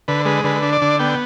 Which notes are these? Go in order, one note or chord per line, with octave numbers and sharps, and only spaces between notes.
D3 B4
G#3 B4
D3 B4
D4
D5
D3
B3 G5